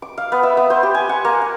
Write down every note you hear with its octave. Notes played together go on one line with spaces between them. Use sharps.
D6
F5
B3
E5
B3
C5
G4
G#5
F#5
A#3
F#5